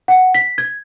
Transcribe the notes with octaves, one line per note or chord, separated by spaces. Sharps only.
F#5
B6
G#6